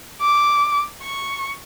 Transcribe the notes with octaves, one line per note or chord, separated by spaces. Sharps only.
D6
C#6